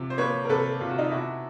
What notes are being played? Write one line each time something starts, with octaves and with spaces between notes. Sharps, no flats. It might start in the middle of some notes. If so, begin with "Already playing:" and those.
Already playing: C3 F3
C5
A#3 B4 C#5
A#4
C3 A4 B4
C3 F4
F#4
D#4 F4
B2 E4 F#4